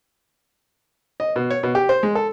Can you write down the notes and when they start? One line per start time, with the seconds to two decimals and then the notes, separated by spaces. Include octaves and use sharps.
1.20 D#5
1.36 B2
1.51 C#5
1.63 B2
1.75 G4
1.89 C5
2.03 G#3
2.15 A4